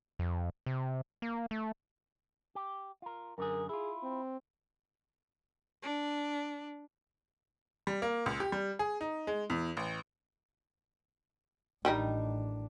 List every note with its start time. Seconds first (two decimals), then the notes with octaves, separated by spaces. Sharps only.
0.19 F2
0.66 C3
1.22 A#3
1.51 A3
2.55 G4
3.02 F4 A#4
3.38 F#2 D3 G#4 A#4
3.69 E4 F4 G#4
4.03 C4
5.83 D4
7.87 G3
8.02 A#3
8.26 C#2
8.40 G4
8.52 G3
8.79 G#4
9.01 D#4
9.27 G#3
9.50 E2
9.77 A1
11.85 A1 D#3 G3 D4 D#4